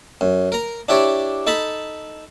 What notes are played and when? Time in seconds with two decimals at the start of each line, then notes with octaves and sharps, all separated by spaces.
0.21 F#2
0.52 A#4 A#5
0.89 D4 E4 G4 C#5 D5
1.47 D#4 A4 A5 B5